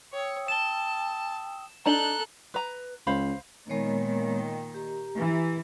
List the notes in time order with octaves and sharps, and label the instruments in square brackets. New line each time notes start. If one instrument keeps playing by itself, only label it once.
[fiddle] C#5 [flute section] G5 D#6 E6
[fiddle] A5 [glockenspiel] E7 G7
[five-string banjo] D4 D#4 [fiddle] A4 F#6 [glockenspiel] A#5 F#7 G7
[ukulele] B4 A#5
[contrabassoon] C#2 [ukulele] C5 F5 B5
[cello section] A#2 D#3 [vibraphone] G#3 B3 C#5
[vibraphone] G5
G4 A#5
[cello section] E3